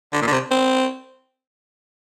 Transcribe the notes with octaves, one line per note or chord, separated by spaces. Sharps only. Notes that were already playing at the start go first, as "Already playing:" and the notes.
D3
A#2
D3
C3
C4